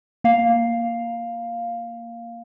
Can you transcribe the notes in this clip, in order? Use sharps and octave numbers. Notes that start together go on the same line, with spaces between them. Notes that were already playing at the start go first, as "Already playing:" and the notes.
A#3 F5